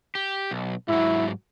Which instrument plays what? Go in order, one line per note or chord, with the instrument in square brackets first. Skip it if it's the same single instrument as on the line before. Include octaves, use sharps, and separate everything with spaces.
[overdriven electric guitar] G4
B1
[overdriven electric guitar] G#2 F#3 [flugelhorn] E4